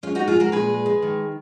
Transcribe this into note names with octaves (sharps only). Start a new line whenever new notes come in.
G#3 C#4 F4
D#4 F#4
G#3
F4 G#4
G#3 F#4 A#4
A#2 G#4 B4
G#3
G#3
D#3